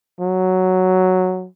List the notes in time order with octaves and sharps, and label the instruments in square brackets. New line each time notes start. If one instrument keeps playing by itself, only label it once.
[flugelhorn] F#3